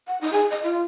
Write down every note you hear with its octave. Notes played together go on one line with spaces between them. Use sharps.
F#5
D#4
G#4
D#5
F4